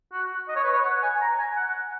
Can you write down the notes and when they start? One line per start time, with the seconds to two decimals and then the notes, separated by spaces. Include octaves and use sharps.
0.13 F#4
0.49 D#5
0.56 C#5
0.64 B4
0.73 C#5
0.84 F#5
1.03 G#5
1.21 A#5
1.39 G#5
1.56 F#5